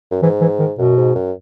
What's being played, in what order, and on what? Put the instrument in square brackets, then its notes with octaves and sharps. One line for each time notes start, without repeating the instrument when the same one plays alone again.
[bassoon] F#2
[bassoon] G#2 [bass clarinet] E3
[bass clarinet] E3
D#3
[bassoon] F#2 [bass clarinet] B2
[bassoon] G#2
F#2